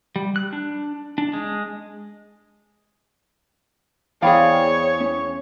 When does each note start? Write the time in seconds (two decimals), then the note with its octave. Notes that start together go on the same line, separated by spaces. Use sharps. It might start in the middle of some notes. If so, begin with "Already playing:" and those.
0.16 G3
0.36 F#6
0.53 D4
1.18 D4
1.33 G#3
4.22 E2 C4 G#4 C#5 D5 F5 G5 B5
5.00 C#4